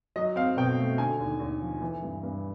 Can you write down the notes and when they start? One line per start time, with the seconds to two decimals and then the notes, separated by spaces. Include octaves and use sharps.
0.16 F#3 D#5
0.36 C4 F5
0.57 B2 G5
0.78 A3
0.98 D3 G#5
1.19 D#2
1.40 D#2
1.61 F3
1.82 E3
2.02 G2
2.23 G2